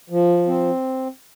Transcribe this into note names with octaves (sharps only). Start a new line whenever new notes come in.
F3
C4